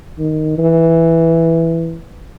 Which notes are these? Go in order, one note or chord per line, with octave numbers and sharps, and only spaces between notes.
D#3
E3